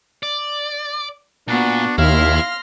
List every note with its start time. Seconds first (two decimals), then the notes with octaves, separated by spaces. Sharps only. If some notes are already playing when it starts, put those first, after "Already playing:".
0.23 D5
1.48 A#2 B3 D4 F#4
1.98 D#2 E4 F5 C6 F6 A#6